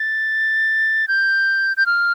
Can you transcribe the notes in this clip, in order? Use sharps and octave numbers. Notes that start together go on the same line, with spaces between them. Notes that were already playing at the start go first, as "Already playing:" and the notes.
Already playing: A6
G6
G6
F6